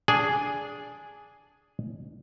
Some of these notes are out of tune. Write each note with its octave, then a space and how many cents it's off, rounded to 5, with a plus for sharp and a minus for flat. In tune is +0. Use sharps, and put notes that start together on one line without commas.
D4 -10 G#4 +0